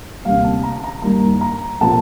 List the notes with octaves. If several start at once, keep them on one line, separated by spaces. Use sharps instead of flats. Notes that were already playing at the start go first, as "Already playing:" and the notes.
D2 C3 G3 A#3 F5
A5
A#5
A#5
G2 D#3 G3 A#3 A#5
A#5
A#2 F3 A3 A5